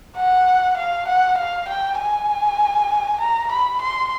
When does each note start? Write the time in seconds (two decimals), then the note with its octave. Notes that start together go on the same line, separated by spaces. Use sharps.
0.16 F#5
0.77 F5
1.07 F#5
1.38 F5
1.68 G5
1.99 G#5
3.20 A#5
3.51 B5
3.81 C6